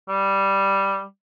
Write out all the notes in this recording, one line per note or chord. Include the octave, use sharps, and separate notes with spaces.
G3